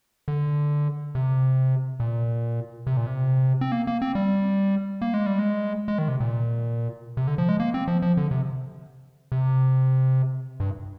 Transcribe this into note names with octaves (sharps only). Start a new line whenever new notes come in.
D3
C3
A#2
C3
A#2
C3
C4
A#3
A#3
C4
G3
A#3
G#3
G3
G#3
G#3
D#3
C3
A#2
C3
D3
F3
G#3
A#3
C4
F3
F3
D3
C3
C3
G2